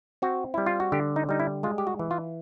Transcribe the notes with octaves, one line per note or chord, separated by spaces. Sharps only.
C4 F#4
G3 E4
F4
F#4
D3 G4
D#4
G3 D#4
E4
G#3 F4
G4
F#4
E3
F4